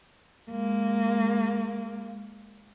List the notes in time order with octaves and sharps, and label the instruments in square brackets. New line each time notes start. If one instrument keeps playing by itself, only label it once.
[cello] G#3 A#3